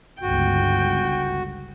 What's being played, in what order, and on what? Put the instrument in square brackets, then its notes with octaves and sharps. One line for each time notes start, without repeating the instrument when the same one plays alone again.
[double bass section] G1 C#2 [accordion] F#4 [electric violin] G5